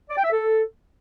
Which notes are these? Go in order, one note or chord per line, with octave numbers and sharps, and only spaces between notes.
D5
G5
E5
A4